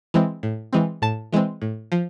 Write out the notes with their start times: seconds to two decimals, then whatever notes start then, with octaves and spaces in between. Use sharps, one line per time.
0.14 E3 G#3 C4
0.43 A2
0.73 E3 G#3 C4
1.02 A2 A5
1.33 E3 G#3 C4
1.62 A2
1.92 F3